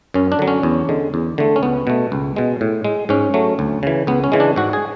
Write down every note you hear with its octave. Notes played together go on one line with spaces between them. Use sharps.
F#2 C#4
D4
D3 F#3
C#4
E2
D3 G#3
E2
D3 A3
C#4
C#2 B3
B2 A3
C#2
B2 G#3
A2
G#3
G#2 C#4
F#3 A3
D2
C#3 E3
C#2 B3
C#4
C#3 E3 G#3
D4
G#2 F#4
G#4